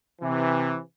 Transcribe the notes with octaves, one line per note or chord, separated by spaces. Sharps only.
C3 E3